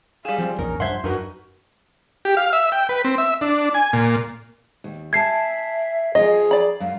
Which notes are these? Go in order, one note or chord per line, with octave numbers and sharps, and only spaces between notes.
G3 G#4 F5 E7
F3 C4
A#1 E2 C#4 D#4 A#4
G2 F3 D4 C5 E5 F#5 C6 G#6
F#2 D4 D#4 F#4 A#4 B4
G4
F5
E5
G5
B4
C4
E5
D4
G#5
A#2
D#2
E5 G#5 A5 G#6 C7
F3 F4 G#4 D#5
D5 B5
F#2 F5